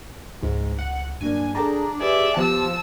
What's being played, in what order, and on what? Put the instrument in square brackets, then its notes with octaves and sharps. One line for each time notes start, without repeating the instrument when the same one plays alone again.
[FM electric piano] C#2 [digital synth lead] G#2
[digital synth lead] F#5
[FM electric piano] G2 F#3 A#3 [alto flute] D4 [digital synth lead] G#5
[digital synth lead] D4 [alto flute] G#4 [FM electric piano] A4 G5 A#5
[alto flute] G4 [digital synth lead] G#4 [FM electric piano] B4 G#5 [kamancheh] D5 E5
[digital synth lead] F3 [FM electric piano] B3 [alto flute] G4 [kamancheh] A5 E6